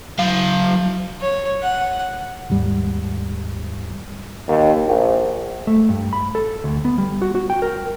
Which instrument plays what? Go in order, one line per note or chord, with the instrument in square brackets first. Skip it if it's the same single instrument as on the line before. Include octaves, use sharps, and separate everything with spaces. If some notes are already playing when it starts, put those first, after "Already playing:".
[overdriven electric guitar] F#3 F5
[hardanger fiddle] C#5
F#5
[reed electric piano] D#2 G#2 G3
[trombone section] D#2
A#1
[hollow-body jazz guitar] A3
G2
B5
A4
D2
B3
G3
F#4
F#4
G5
A#4